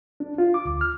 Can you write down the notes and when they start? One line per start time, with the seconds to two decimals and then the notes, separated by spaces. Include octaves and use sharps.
0.20 D4
0.38 F4
0.54 D6
0.65 D2
0.81 F6